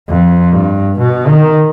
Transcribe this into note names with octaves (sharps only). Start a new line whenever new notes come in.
F2
G2
B2
D#3